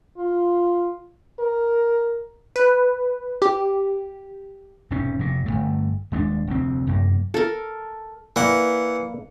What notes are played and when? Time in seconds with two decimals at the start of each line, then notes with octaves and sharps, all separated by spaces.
0.18 F4
1.39 A#4
2.56 B4
3.42 G4
4.91 E1 G#2 C3 C#4
5.19 F1 A#2
5.46 G1 C#2 A3
6.12 D#1 G#3 A3 D4
6.47 F1 D2 C4
6.87 F1 F#2 A#3
7.34 A4 A#4
8.36 E3 A#3 B4 D5 F#5